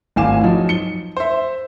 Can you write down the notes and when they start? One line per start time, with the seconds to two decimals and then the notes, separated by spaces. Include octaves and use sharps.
0.16 G#1 A2 F5 G#5 D6 E7
0.44 F3 F#3 D#4
0.69 C#7 G7
1.17 C5 E5